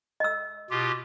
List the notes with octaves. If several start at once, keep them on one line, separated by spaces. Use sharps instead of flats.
D#5 E6
B2 F4 G4